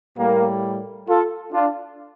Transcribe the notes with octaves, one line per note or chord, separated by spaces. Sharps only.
A2 G3 A#3
F4 A4
D4 F4